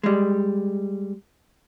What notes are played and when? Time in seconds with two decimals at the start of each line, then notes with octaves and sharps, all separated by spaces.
0.03 G3 G#3